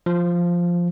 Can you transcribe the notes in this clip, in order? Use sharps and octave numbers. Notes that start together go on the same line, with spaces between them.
F3